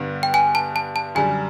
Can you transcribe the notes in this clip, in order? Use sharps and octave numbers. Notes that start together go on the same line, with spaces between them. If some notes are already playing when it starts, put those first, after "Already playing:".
Already playing: G2 D3 G3 B3
G5
G#5
A5
A5
A5
F#2 D3 G3 G#5